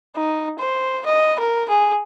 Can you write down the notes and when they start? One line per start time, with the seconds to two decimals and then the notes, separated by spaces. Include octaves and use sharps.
0.15 D#4
0.58 C5
1.06 D#5
1.39 A#4
1.69 G#4